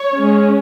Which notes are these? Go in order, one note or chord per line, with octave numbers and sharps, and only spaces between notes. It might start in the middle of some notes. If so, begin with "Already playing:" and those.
Already playing: C#5
G#3 C#4